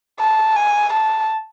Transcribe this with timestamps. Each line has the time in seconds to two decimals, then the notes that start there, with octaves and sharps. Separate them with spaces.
0.20 A5
0.56 G#5
0.93 A5